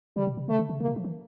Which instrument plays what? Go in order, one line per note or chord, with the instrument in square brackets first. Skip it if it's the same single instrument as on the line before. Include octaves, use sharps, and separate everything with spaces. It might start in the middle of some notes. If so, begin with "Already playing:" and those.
[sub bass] C#3 [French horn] G3
[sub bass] B2
C3
[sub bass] C#3 [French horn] A3
[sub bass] D3
C#3
[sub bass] C3 [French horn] A#3
[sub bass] B2
F3
E3